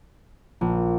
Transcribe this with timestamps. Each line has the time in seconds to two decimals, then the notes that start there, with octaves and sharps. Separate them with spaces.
0.61 A#1